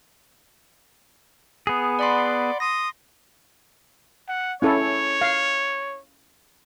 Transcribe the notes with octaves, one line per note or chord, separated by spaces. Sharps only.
B3 G#4
D5 F#5 B5 C6
C6 D#6 A#6
F#5
C#4 E4 A4 C#5
F5